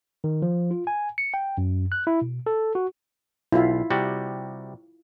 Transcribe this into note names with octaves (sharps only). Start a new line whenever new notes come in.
D#3
F3
F4
G#5
C#7
G5
F#2
F#6
E4
B2
A4
F#4
B1 E4 F4
C3 G3 F#4